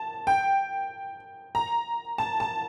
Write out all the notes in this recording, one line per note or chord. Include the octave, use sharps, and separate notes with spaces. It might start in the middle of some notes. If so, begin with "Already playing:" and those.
Already playing: A5
G5
A#5
A5
A5